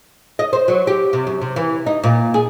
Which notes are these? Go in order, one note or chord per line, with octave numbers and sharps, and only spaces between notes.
D#5
C5
F#3
G4
C3
F#2
C3
E3
D#4
A#2
G#4